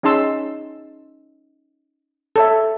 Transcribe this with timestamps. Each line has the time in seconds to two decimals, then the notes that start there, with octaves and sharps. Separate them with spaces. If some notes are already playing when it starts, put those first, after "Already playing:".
0.03 C#4 D#4 G#4 A5 C6 E6
2.36 A4 C#5 E5